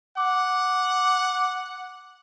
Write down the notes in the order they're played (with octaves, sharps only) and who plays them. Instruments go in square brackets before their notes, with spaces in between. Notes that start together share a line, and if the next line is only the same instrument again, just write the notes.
[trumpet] F#5 [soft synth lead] D6